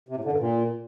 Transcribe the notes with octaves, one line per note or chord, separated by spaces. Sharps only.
C3
A2
D3
G2
A#2